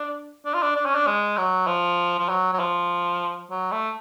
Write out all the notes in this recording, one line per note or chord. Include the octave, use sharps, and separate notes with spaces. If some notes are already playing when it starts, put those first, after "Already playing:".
Already playing: D4
D4
F4
D4
D4
C#4
D4
G#3
F#3
F3
F3
F#3
F#3
F3
F#3
A3